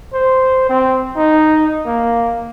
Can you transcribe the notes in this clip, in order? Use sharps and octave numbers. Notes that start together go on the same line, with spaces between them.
C5
C4
D#4
A#3